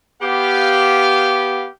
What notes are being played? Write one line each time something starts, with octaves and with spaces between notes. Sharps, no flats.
B3 G4 F5